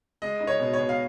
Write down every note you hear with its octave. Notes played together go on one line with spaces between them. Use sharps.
G#3 D#5
D#4
C#5
B2
C#5
B2
F5